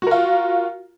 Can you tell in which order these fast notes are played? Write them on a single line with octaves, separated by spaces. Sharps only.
F#4 A#4 F4